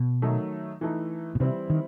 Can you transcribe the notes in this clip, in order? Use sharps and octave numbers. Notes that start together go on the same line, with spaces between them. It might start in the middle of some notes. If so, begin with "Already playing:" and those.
Already playing: B2
D#3 F#3 A3 D#4
E3 A3 D#4
B2
C3 E3 G3 C4 E4
D#3